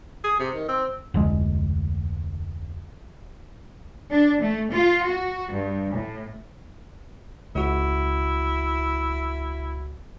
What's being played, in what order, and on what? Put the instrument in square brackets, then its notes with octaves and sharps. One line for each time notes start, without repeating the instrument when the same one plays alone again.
[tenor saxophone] G#4
C3
D#3
C4
[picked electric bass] F1 D2 G#3
[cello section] D4
A3
F4
F#4
G2
A2
[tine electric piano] C#2 F#4 [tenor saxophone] E4